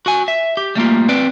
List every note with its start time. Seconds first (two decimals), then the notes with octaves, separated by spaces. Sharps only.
0.06 F#4 G#5
0.28 E5
0.57 G4
0.75 G3 A3 A#3 F4
1.09 C4 B4 D5